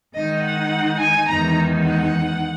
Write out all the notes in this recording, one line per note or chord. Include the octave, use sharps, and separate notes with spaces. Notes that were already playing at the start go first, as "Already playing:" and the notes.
D#3 G#3 D#4 D#5
F#5
G#5
E2 D#3 G#3 D#4 A#5
F#5